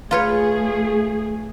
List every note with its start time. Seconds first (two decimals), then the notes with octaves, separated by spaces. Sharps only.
0.11 A3 F4 G#4 B4 C#5